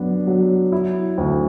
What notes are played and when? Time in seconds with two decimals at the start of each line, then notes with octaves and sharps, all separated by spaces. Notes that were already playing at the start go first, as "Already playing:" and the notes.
Already playing: F#2 B3 D4
0.27 F#3
0.72 E4
1.18 D2